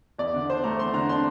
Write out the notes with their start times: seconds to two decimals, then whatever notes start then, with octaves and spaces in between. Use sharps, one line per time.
0.18 E2 D5
0.34 D3
0.49 D4 C5
0.64 A3 A#5
0.79 E2 C6
0.94 D3 A#5
1.09 D4 C6